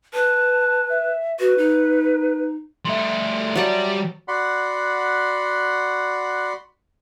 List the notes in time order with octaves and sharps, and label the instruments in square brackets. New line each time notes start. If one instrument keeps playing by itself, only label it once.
[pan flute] B4 [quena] A5
[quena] E5
[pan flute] F#4 [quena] B4
[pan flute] D#4
[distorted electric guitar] G3 A3 [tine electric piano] E5 C6
[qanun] F#3 A5 [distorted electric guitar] G3 D5
[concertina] F#4 D5 F#5 B5 C6